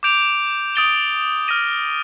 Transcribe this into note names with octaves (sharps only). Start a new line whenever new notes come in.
D6 G6 D7 F7
D#6 A6 D7 G7
F6 A#6 D#7